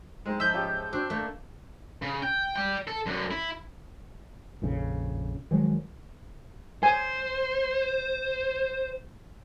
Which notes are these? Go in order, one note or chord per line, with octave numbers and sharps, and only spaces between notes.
G#3 C4 D#4
G#2 F3 E5 E6 G6
C#4 F4 G4
C4 D4 F#4
A3 A#3
C#3
G5
D5 G5
A4
F#2 D3
E4
A#1 F2 C#3
D#3 F3 F#3 G#3
C5 G#5